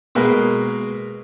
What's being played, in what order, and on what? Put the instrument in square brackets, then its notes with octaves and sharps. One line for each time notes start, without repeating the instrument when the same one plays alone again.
[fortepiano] B2 G#3 A#3 G#4 A#4 B4